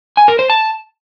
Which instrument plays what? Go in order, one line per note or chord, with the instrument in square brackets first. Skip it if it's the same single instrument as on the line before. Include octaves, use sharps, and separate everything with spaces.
[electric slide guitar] G#5
A#4
C5
A5